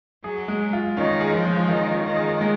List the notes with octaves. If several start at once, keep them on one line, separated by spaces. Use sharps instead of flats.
F#3 G#4
G#3
F4
D#3 C#4
G#4
F3
G#3
D#3 F4
C#4
D#3
G#4
G#3